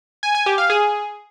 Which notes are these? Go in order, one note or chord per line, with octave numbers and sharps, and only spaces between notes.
G#5
G#5
G4
F5
G#4